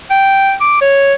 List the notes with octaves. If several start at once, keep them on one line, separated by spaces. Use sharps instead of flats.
G5
D6
C#5